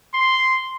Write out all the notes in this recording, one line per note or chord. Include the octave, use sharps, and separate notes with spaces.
C6